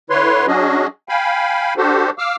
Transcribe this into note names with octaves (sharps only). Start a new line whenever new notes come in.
D3 E4 B4 C#5 C6
F#3 C#4 D4 F#4 G#4 D#5
F5 G5 G#5 B5
D4 F#4 G4 A4 C5
F5 D6 E6 F6